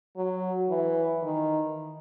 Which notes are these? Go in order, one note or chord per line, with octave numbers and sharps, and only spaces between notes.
F#3
E3
D#3